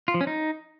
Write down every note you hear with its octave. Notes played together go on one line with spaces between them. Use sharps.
F4
F3
C#4
D#4